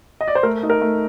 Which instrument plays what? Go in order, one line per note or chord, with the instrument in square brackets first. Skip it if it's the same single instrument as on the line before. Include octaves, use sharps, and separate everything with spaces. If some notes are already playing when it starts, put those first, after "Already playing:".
[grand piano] D#5
D5
C5
A3 A#4
D#4
A#4
A3